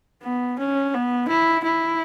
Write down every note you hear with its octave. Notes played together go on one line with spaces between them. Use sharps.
B3
C#4
B3
E4
E4